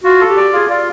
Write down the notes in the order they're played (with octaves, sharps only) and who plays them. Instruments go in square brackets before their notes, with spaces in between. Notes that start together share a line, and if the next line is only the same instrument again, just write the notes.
[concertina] F4 [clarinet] F#4
[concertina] A4
[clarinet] G4
[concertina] D5
[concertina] F4 [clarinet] G#4
[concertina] F4 [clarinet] D5